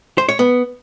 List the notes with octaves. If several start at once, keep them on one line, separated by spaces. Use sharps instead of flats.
C5
C#5
B3